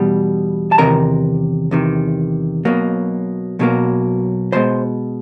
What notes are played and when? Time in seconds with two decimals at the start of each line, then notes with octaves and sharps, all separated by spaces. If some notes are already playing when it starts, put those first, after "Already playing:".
Already playing: E2 B2 G3
0.72 A5
0.78 E2 C3 D#3 A#4 A#5
1.71 E2 C3 D#3
2.65 B1 B2 F#3 A#3
3.59 B1 B2 F#3 A#3
4.52 C2 B2 G#3 C5 C6